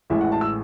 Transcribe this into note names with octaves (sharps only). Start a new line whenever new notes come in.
A1 A2 E3 G#3 E5
F#5
A5
E6